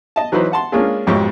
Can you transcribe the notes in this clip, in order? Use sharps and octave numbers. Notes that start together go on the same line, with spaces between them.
D#5 A5
E3 F#3 D#4 B4 C5
F#5 A5 C6
G#3 A#3 C#4 D4 F4 G#4
B1 F2 G#2 G4 C#5 C#6